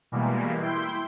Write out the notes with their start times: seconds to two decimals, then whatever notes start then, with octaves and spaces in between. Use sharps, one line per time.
0.12 B2 E3 G3 G#3 A#3
0.61 E4 G5 C6